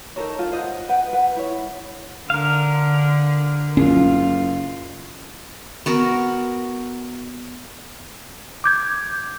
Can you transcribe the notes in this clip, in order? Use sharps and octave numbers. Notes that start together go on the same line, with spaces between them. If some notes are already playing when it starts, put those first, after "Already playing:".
D#4 A4 A#4 C#5
F4 A4
C5 D#5 E5 F#5
B4 F#5 G5
B4 F#5
E4 C#5
D3 A#4 F5
F#1 C#4 F4
B3 F#4 A#4
D6 G6 G#6